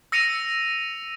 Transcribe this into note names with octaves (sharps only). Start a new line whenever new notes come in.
E6 A#6 C#7 D#7 F7